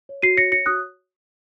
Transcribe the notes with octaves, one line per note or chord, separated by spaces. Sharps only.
C#5
F#4 C7 D#7
C#5 A#6 C#7
C#5 A#6 C#7
F#4 D#6 F#6